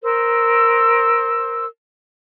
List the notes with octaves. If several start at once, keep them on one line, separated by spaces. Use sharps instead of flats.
A#4 C5 E6